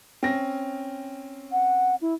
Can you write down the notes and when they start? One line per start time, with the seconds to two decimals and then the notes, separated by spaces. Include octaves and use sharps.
0.23 C4 C#4 A#6
1.52 F#5
2.01 E4